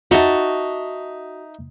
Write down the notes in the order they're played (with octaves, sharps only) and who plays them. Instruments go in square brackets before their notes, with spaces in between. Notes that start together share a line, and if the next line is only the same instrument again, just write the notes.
[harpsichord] D#4 E5 [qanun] F#4 A5